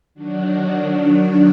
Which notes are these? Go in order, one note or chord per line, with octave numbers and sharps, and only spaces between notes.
D#3 F#3 D4 F#4